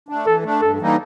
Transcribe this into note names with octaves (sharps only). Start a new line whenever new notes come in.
A3 D4
E3 A4
A3 D4
G2 A4
E3 G3 A#3 D#4